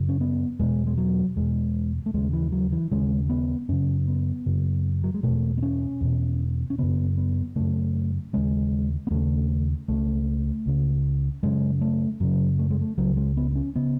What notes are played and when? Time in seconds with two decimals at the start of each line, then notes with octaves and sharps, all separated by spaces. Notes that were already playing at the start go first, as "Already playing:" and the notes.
Already playing: F#2 C#3
0.09 C#4
0.21 B3
0.59 E2 B2 G#3
0.87 G#3
0.98 F#3
1.36 E2 B2 G#3
2.06 A3
2.14 D#2 C#3 G#3
2.33 E3
2.52 F#3
2.72 E3
2.92 D#2 C#3 G#3
3.30 B3
3.69 F#2 C#3 C#4
4.08 B3
4.46 F#2 C#3
5.04 F#3
5.14 G#3
5.23 E2 B2 A3
5.58 B3
5.63 C#4
6.01 E2 B2
6.70 C#4
6.78 F#2 C#3 B3
7.17 B3
7.56 F#2 C#3 A3
8.33 D#2 C#3 G#3
9.07 B3
9.11 D#2 C#3 A3
9.88 C#2 C#3 A3
10.66 C#2 C#3
11.43 F#2 C#3 G#3
11.81 A3
12.20 F#2 C#3 F#3
12.59 A3
12.71 G#3
12.81 A3
12.98 C#2 C#3 F#3
13.17 G#3
13.37 B3
13.51 B3
13.55 C#4
13.76 C#3 B3